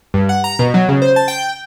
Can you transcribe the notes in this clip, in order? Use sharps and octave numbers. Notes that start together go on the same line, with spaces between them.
G2
F#5
A#5
B2
F#3
C#3
C5
A5
G5